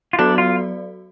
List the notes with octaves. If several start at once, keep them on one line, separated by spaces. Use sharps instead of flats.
F4
F#3 B3 D4 F#4 A4 D5
F4